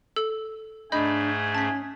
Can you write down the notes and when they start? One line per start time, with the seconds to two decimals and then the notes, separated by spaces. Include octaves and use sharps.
0.16 A4 E6
0.92 G#2 A3 D4 G#4 D#5 G#5 B5 G6
1.55 C#4 A5 B6